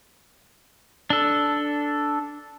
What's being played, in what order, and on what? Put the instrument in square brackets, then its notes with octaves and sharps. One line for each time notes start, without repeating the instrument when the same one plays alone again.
[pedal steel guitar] D4 A4